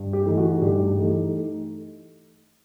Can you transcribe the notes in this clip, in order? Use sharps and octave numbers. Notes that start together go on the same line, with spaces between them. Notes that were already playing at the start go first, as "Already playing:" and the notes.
Already playing: G2
G4
E3 A3 D#4
F#4
G2 G4
E3 A3 D#4